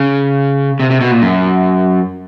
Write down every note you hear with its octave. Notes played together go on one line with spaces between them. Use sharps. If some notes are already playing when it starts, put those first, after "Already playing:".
Already playing: C#3
C3
C3
B2
A#2
F#2